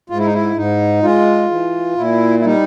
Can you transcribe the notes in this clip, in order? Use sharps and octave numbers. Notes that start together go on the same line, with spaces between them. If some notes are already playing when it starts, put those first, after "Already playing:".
G#2 F4
E4
D#4
E4
G#2 D#4
G#3 F4
E3
A#2 E4
E4
G3 D#4